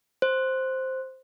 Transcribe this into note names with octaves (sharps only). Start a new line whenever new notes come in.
C5